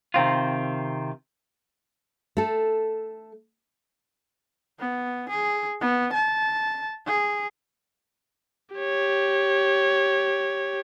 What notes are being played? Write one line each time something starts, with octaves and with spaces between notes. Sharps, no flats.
C3 D#3 C4 F4
A3 A4
B3
G#4
B3
A5
G#4
G4 C#5